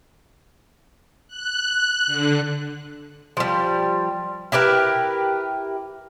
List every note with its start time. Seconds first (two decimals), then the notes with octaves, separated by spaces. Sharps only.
1.28 F#6
2.06 D3
3.37 F3 G3
4.52 E4 G4 A#4 B4